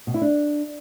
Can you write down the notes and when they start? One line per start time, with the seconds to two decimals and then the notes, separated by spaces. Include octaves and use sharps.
0.07 B2
0.14 E4
0.22 D4